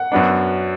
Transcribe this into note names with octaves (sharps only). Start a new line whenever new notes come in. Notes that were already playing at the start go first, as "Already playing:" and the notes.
Already playing: F#5
F#2 F#3 B3 D4